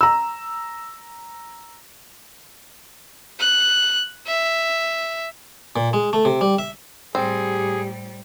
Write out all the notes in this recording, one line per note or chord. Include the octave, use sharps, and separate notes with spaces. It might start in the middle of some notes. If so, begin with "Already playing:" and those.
A#5 E6
F#6
E5
A#2
G#3
A3
C3
G3
E5
A2 G3 C4 G4 G#4